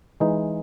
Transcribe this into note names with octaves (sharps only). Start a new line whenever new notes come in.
E3 G#3 D#4